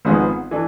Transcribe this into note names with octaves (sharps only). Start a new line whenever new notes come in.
G#1 G#2 F3 G#3 B3
E3 A3 D4